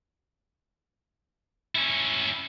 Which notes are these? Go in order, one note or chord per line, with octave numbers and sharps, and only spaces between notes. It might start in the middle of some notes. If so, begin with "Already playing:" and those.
C#4 E4